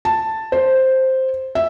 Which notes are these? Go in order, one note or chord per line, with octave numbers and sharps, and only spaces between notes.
A5
C5
E5